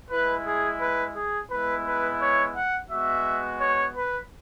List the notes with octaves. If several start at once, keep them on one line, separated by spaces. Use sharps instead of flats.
G#3 E4 B4
G#4
B4
G#4
G#3 B3 E4 B4
B4
C#5
F#5
G#3 B3 F#4 E5
C#5
B4